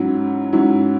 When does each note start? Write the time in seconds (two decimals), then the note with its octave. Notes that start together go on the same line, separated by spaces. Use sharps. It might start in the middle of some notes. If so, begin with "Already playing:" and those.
Already playing: G#2 F#3 C#4 E4
0.53 G#2 F#3 C#4 E4